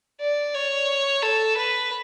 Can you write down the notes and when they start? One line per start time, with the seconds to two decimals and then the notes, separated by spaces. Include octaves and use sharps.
0.21 D5
0.55 C#5
1.23 A4
1.57 B4